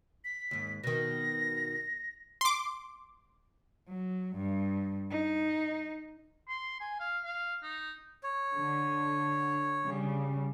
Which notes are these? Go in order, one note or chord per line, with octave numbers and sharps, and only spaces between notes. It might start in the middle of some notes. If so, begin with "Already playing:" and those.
B6
D#2 G#2
B2 D#3 A#6
C6 D6
F#3
G2
D#4
C6
G#5
F5
F5
D#4
C#5
D3
C#3 G3